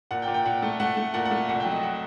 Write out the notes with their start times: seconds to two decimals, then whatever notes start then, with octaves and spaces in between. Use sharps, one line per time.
0.11 A#2 F#5
0.22 G5
0.28 A#2
0.34 G5
0.45 A#2 F#5
0.62 A3
0.80 A3 F#5
0.97 A3
1.14 A#2 F#5
1.25 F#5
1.31 A3
1.48 C2 F#5
1.60 G5
1.66 F#3
1.72 D#5
1.83 F#5